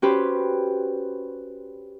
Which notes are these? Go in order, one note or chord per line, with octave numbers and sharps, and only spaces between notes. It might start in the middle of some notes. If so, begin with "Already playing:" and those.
C#4 F#4 G4 B4 C5